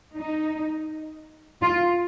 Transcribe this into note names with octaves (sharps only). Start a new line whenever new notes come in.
D#4
F4